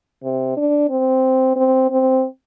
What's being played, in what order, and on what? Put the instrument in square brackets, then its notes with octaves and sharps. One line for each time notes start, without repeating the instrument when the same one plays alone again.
[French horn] C3
D4
C4
C4
C4